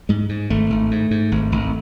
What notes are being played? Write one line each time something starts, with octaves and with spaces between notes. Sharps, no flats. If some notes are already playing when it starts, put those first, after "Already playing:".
G#2 G#3
G#2
G#1 A3
G#1
G#2
G#2
G#1
G#1